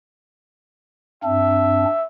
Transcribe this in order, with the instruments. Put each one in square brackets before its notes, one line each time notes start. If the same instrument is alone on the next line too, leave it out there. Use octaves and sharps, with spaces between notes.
[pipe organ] G2 C4 D4 [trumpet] E5